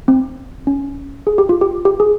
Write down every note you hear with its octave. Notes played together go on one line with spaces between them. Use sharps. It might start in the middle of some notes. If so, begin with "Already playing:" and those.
C4
C#4
G#4
G4
F4
G4
G4
G#4